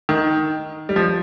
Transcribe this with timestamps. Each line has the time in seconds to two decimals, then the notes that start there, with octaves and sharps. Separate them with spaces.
0.09 D#3
0.89 G3
0.96 F3